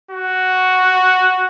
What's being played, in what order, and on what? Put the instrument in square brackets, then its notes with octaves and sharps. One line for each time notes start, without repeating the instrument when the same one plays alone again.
[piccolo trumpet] F#4